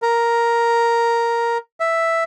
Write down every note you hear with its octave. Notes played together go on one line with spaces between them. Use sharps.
A#4
E5